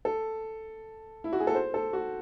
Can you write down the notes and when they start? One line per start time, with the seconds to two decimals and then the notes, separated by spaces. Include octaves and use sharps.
0.05 A4
1.24 E4
1.33 F#4
1.40 G#4
1.47 A4
1.55 C5
1.74 A4
1.93 F#4